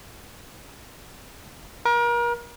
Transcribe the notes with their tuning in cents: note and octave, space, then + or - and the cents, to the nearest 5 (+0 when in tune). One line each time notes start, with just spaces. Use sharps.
A#4 +35